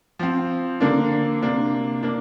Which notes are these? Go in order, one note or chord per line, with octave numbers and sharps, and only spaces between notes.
F3 C4
D3 A#3 D4
C3 A#3 D4
A#3 D4